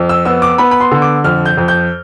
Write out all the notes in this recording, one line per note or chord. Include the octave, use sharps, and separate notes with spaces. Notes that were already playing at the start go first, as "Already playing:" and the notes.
Already playing: F2
E6
B3 E6
D6
B3 B5
B5
C6
D3
D6
F2 F6
G6
F2
G6